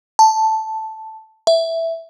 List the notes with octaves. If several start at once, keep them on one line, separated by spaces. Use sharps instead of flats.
A5
E5